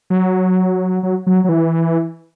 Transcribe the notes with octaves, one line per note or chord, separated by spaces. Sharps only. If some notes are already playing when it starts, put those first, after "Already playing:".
F#3
F#3
F#3
F#3
E3